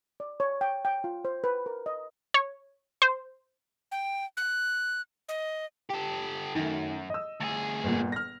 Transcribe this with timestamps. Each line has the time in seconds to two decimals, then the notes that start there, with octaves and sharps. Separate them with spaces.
0.20 D5
0.40 C#5
0.61 G5
0.85 G5
1.04 F4
1.25 C5
1.44 B4
1.66 A#4
1.86 D#5
2.34 C#5
3.02 C5
3.91 G5
4.37 F#6
5.28 D#5
5.89 G4 A4
6.55 F#2 D#3 A3
7.10 D#5 E6
7.41 D2 G#4
7.84 G1 A#2
8.12 F6 A#6